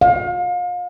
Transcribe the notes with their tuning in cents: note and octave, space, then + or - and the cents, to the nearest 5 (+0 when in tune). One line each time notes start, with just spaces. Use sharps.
F5 +35